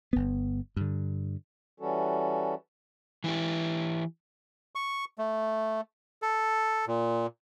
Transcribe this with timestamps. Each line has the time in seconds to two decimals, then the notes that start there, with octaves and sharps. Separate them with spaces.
0.13 G1 B3
0.77 G2 D3
1.80 E3 G3 C#4 F#4 A4
3.24 E3 E4 G4
4.75 C#6
5.18 A3
6.22 A4
6.87 A#2